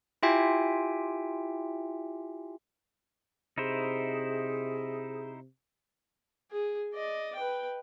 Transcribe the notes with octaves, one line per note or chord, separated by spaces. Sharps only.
E4 F4 G4 E5 G5 G#5
C3 D#4 E4 G#4 C5
G#4
D5 D#5
B4 G5